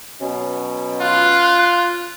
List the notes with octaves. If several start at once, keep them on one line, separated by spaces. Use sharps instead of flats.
B2 F#3 C#4
F4 F#6